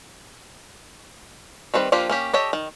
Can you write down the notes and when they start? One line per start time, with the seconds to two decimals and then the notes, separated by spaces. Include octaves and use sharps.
1.74 D#3 G3 C4 B4
1.92 F3 A#3 D4 F4 G4
2.10 A#3 C#4 G4
2.33 G4 A4 C#5 D#5
2.53 D#3